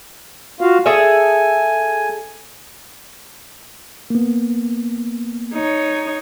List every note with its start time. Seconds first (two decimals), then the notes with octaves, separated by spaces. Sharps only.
0.61 F4 F#4 F5
0.86 G#4 A4 E5 G#5
4.10 A#3 B3
5.54 D#4 C#5